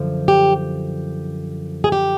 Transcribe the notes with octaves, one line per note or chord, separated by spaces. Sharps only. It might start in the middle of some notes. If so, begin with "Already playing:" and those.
Already playing: F#2 D3 F3
G4
G#4
G4